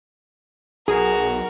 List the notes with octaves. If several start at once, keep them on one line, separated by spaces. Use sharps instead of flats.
B1 F#4 G#4 A#4